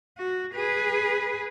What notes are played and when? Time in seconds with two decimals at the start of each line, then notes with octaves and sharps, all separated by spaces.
0.18 F#4
0.54 G#4 B4